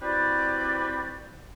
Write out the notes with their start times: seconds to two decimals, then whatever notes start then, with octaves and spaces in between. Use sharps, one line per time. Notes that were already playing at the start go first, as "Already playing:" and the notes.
0.02 C4 E4 F#4 G4 B4 D5